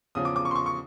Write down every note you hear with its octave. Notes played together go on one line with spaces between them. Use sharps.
E2 C#3 F3 D#6
D6
D6
C#6
C6
C#6
C#6